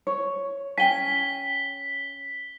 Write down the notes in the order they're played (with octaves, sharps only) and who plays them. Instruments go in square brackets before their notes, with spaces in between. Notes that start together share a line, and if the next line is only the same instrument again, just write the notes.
[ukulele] C#5
[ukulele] C#4 G5 G#5 [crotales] B6 G7